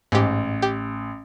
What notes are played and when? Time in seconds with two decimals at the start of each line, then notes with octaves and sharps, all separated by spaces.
0.12 A1 G#2 G4
0.62 G4